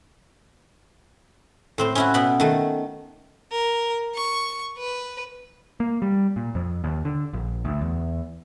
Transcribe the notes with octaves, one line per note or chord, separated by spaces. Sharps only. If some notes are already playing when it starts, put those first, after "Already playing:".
A2 C4 C5
C#4 E4 F#4
B2 B3 B5
D#3 A3
A#4
C#6
B4
A#3
G3
A#2
F2
D#2
D3
A#1
D2
E2